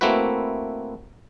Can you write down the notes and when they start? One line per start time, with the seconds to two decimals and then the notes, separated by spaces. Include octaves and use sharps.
0.01 A3 A#3 C4 E4 F#4 B4